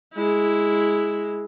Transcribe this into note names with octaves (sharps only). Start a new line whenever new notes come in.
G#3 E4